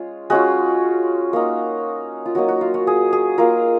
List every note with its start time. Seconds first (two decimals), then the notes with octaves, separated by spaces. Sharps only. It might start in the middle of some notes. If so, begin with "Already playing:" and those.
Already playing: G#3 C#4 F4
0.30 G#3 C#4 F4 F#4
1.33 A#3 D#4
2.26 F4
2.35 F#3 A#3 D#4 F#4
2.48 F#4
2.61 F4
2.74 F#4
2.87 G#4
3.13 G#4
3.38 A#3 F4 A#4